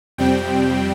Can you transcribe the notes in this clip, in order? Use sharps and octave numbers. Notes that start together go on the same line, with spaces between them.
F2 C3 G3 C4 G5